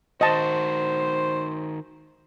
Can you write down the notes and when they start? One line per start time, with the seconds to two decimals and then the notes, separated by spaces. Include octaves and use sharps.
0.21 D#3 F#4 C5 D#5 A5